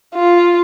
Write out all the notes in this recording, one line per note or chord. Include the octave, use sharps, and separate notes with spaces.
F4